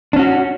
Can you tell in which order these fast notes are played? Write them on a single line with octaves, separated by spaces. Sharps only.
D4 C#4 F#4